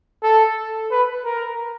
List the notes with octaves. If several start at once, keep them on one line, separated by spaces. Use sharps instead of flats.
A4
B4
A#4